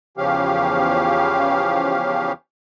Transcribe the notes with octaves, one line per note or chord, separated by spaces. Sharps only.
E2 C#3 F3 C#4 G4 F5